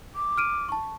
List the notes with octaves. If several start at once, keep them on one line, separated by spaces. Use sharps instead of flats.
D6
F6 D7 D#7
A5 C#6